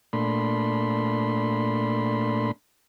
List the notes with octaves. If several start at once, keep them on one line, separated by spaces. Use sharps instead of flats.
A#2 A3 D4 B5 C6